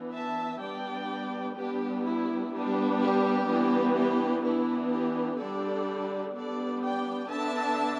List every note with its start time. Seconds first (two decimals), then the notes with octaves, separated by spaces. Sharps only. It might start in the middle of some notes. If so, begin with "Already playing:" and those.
Already playing: E3 B3 D4
0.13 E5 A5
0.62 G3 B3 D4 D5 G5
1.56 G3 B3 D4 G4
2.05 E4
2.52 G3 B3 D4
3.01 G4
3.48 E3 G3 B3 D4
3.96 G4
4.44 E3 B3 D4 E4
4.92 G4
5.39 D3 G3 D4 A4 D5
6.35 G3 B3 D4 A4 D5
6.83 D5 G5
7.30 D3 B3 D4 E5 A5